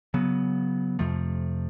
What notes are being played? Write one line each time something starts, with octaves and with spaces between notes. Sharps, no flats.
C#3 F#3 B3
F2 C3 F3 A3